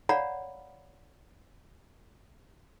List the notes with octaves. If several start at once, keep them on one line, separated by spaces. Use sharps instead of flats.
C#5 D5 F5 F#5 A#5 B5